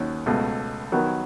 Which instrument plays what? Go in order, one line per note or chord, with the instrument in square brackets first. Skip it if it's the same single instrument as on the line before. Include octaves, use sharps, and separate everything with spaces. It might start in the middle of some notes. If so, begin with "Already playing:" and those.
Already playing: [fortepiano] D#2 D#3 F#3 C#4
C#2 B2 A3
D#3 F#3 B3